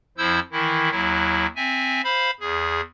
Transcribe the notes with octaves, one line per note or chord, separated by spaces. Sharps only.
F2 F3 E4 C5 E6 G6
D#3 E3 E4
D#2 F#3 E4
C4 E5 G#5
C5 F5 B5
E2 G#4